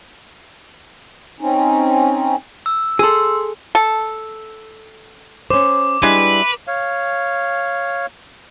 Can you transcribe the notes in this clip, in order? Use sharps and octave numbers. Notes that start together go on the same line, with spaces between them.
C4 C#4 D#4
E6
G#4 A4 C6 E6
A4
C#4 C5 D6
G3 G#3 D4 E4 B4
C#5 F5